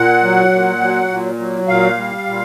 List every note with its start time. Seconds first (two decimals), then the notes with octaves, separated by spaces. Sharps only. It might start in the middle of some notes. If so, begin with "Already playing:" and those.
Already playing: A#2 F#5
0.23 F#3
0.52 A#2
0.81 F#3
1.10 A#2
1.39 F#3
1.68 A#2 F5
1.98 G3
2.27 A#2